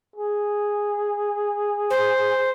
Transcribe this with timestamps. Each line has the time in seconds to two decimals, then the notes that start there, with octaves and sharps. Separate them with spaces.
0.16 G#4
1.90 C5